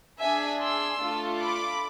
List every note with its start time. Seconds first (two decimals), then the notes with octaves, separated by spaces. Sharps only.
0.20 D4 G#4 E5 G#5
0.60 C6 E6
0.99 A3 D4 F4 A4
1.38 B5 D6